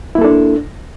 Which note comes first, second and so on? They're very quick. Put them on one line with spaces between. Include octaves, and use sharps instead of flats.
E4 A#3 A4 D4